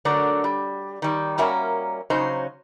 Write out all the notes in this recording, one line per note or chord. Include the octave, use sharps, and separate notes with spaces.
D3 F#3 A3 A#4 D5
G3
D#3 G3
G3 A#3 C#4 F#4 A#4 E5
C#3 F#3 C#4 D#4 C5